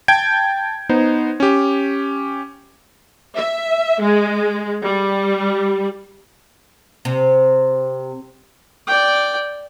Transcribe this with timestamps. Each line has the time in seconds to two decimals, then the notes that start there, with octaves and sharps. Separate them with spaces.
0.08 G5 A5 G6 G#6 D7
0.89 B3 D#4 C5
1.40 C#4 G4
3.36 E5
4.00 G#3
4.84 G3
7.05 C3
8.87 D5 G5